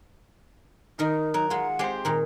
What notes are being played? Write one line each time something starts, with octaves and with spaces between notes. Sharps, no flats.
D#3 D#4 A#4
F#3 A#4
G#3 F4 F#5
G#3 C4 G4 C5
A#2 D#3 A#5